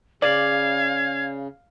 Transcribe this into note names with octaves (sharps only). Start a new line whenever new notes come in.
C#3 D5 F5 G#6